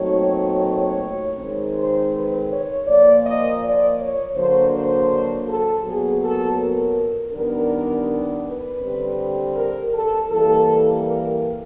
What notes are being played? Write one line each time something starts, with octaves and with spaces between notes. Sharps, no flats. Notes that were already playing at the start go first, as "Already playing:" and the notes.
Already playing: A#2 F#3 A3 C4 D#4 C#5
C#5
D#3 G#3 C4
C5
B4
C#5
A#2 F3 A#3 D5
D#5
D5
C#5
D3 F#3 A#3 D4 C5
C5
A4
A#2 F#3 B3 G#4
A4
A#4
D#3 G3 B3 D4 A#4
B4
D3 G3 C4
A#4
A4
E3 G3 A#3 A4
A#4